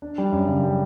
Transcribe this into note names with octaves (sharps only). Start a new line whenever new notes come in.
D4
G3
F#2
C#3
G3